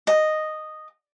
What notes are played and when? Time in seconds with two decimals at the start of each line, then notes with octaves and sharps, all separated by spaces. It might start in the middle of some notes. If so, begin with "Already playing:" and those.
0.07 D#5